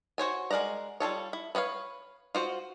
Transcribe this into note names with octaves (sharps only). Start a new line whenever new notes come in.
F#4 C5 C#5 G#5
G#3 A#4 D5 F#5 A#5
G3 F4 A4 C#5
E4
B4 C#5 D#5 F5
F4 F#4 C5